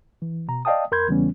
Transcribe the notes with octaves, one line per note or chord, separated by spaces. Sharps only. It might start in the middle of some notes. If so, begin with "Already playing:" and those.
E3
B2 A#5
D5 D#5 F5 G5 A5 D#6
F2 A#4 B5 C6 G6 G#6
E2 C#3 E3 G3 B3 C#4